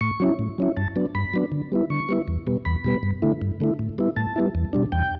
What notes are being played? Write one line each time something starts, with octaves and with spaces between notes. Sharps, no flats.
A2 C#6
F#3 C#4 E4
A2
F#3 C#4 E4
G2 A5
F#3 B3 D4
G2 B5
F#3 B3 D4
D3
G3 B3 E4
D3 C#6
G3 B3 E4
E2
B2 G3 B3
E2 B5
B2 G3 B3
G2
D3 A3 E4
G2
D3 A3 E4
A2
G3 B3 E4
A2 A5
G3 B3 E4
E2
B2 G3 D4
E2 G5